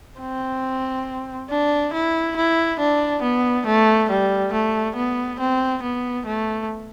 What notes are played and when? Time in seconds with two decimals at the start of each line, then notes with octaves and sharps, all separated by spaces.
0.20 C4
1.50 D4
1.93 E4
2.36 E4
2.79 D4
3.22 B3
3.66 A3
4.10 G3
4.53 A3
4.96 B3
5.39 C4
5.83 B3
6.26 A3